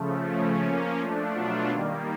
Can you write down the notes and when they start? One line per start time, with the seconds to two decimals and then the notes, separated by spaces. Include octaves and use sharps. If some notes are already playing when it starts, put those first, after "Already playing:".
Already playing: C#3 F3 A3
0.29 C#3 F3 A3 C#4
0.64 F3 A#3 C#4
0.99 F3 A3 D4
1.34 B2 F#3 A3 D4 F4
1.70 D#3 G3 A#3